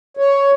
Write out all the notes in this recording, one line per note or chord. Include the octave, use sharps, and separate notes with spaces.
C#5